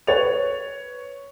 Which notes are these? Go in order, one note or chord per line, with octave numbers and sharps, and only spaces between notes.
B4 C#5 A6 F7